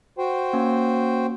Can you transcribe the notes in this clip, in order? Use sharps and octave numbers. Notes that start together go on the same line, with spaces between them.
F#4 C5 G5
A#3 C#4